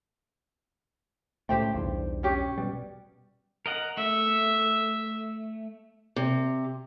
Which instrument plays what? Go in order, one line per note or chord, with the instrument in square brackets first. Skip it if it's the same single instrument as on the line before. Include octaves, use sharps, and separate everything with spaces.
[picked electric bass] C#2 A2 A3 [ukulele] G4 C5 G5
[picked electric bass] B1 E2 G2
[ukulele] C#4 G4 C#5
[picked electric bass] B2 G3
[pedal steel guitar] A#4 D#5 F#5
[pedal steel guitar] A3 [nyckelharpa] E5
[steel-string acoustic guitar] C3